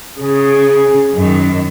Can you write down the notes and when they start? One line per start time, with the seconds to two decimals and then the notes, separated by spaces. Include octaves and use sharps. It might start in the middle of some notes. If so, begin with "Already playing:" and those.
0.19 C#3 G#4
1.14 F#2 D#3